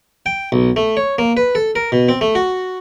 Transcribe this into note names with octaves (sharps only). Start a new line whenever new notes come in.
G5
B1
A3
C#5
A#3
B4
A4
A#4
B2
C4
A3
F#4